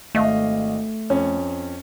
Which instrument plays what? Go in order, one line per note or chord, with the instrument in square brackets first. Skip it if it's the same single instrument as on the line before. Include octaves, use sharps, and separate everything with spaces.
[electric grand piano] G#1 D#5 F5 [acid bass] A3
[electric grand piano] F2 [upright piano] C#4